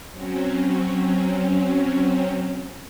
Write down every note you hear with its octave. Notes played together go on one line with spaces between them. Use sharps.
F#3 C4 C#4